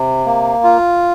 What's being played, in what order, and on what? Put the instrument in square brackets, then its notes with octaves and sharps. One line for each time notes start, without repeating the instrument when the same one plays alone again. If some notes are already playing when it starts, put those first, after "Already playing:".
Already playing: [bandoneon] C3
A#3
F4